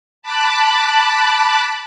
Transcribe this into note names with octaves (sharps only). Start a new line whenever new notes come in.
A5 B5 D6 F#6